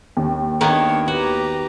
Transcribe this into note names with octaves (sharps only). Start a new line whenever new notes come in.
D#2
D#3 A#3 B3 D4 C#5
F#4 G4 B4 A#5